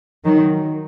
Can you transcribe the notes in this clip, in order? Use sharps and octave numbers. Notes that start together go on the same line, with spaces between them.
D#3 F#3